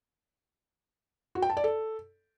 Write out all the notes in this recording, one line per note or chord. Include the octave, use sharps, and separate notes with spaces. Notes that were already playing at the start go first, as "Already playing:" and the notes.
F#4
G5
A5
D5
A4